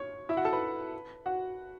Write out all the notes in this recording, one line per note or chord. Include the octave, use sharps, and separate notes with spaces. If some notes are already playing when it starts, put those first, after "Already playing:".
Already playing: C#5 C#6
E4 E5
F#4 F#5
A4 A5
B4 B5
F#4 F#5